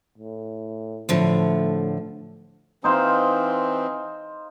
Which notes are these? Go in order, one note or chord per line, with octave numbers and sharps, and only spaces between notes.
A2
A2 D3 F3 A3
E3 C4 D#4 C5 F5